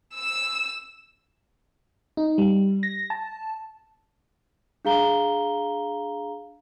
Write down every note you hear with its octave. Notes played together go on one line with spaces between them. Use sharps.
E6 E7
D#4
G3
A#6
A5
D4 G#4 F5 A#5 G7